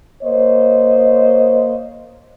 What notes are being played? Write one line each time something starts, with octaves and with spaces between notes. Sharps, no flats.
A#3 C5 C#5 D#5